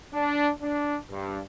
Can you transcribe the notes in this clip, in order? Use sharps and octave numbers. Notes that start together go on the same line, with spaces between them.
D4
D4
G2